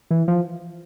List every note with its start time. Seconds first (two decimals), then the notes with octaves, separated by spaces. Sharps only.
0.11 E3
0.28 F3